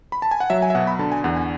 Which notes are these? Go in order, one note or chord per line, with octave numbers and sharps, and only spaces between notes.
B5
A5
G#5
F#5
F#3 E5
G#5
E5
B2 F#5
B5
D3 A5
G#5
E2 F#5
G#5